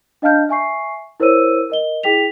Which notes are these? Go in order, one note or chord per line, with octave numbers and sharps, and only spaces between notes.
D4 D#5 F5 A5 F6 G6
E5 G#5 C#6 C7
E4 A#4 C5 C#5 E6 D#7
A#4 D#5 G7
E4 G#4 G5 B6 F7